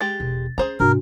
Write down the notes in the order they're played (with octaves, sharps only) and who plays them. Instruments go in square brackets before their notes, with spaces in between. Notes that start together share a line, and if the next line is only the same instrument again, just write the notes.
[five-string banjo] G#3 G4 [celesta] A6
[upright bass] E1
[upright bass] C#4 [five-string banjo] G#4 C5 A#5
[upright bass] G#2 C3 [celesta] D4 F#4 [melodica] A#4